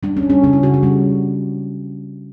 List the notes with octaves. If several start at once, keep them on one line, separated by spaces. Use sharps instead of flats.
G3 D4
C#4
G3
C#4
C#3 C#4
E4
C#3 F#4
F#4
G3 C#4